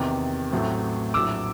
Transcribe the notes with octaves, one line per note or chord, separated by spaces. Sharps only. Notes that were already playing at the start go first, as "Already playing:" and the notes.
Already playing: E2 C3 D#3 D6
A1 A2 F#3 A3 C4
A#1 A2 F#3 D6 E6